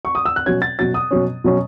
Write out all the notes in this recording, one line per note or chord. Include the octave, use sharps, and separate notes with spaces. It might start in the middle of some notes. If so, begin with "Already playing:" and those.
C#6
D#6
E6
F#6
B2 F#3 C#4 G#6
A6
B2 F#3 C#4 A6
D#6
B2 F#3 C#4
B2 F#3 C#4